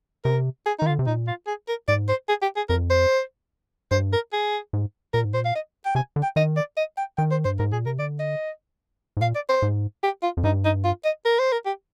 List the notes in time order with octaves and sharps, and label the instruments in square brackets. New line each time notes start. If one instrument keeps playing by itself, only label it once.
[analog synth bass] C3 [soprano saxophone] A#4
[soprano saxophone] G#4
D#4
[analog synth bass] D#3
[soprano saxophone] F4
[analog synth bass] D3
C3
[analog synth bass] A#2 [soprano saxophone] D#4
[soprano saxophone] F4
G#4
A#4
[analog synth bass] G#2 [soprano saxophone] D5
[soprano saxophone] C5
G#4
G4
G#4
[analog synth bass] F2 [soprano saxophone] A#4
[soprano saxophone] C5
[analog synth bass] G2 [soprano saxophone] C5
[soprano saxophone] A#4
G#4
[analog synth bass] G#2
[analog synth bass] A#2 [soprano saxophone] A#4
[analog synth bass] G#2
[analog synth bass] A#2 [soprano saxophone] C5
[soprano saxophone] F5
D#5
G5
[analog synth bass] C3 [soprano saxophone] G#5
[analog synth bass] D3
[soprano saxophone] G5
[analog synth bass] D#3 [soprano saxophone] D#5
[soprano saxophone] D5
D#5
G5
[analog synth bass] D#3 [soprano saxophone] G5
[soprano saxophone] C5
[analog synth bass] G2 [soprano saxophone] C5
[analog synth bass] G#2 [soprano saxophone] A#4
[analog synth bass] A#2 [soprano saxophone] G#4
[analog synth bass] C3 [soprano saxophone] A#4
[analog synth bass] D3 [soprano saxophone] D5
[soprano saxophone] D#5
[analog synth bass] G#2
[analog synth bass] A#2 [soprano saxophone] F5
[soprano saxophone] D5
C5
[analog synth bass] G#2
[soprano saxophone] G4
F4
[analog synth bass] F2
[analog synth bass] G2 [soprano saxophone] D#4
[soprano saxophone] D#4
F4
D#5
A#4
C5
A#4
G4